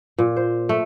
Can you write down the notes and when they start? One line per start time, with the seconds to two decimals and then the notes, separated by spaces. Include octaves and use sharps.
0.18 A#2
0.37 C5
0.69 A3